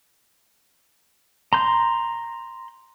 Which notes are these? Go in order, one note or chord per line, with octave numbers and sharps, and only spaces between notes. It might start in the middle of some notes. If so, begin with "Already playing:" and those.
A#5 C6 G6